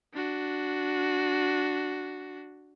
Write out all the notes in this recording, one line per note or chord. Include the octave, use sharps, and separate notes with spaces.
D4 F#4